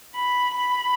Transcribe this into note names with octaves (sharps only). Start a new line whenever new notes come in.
B5
B5